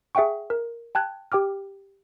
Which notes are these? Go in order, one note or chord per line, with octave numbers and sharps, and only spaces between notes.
G#4 E5 F#5 G5 C#6
A#4
G5 A5 F#6 G#6
G4 G5 D6 F6